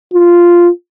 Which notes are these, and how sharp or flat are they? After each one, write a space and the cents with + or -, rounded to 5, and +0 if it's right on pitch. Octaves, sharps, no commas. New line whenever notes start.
F4 -5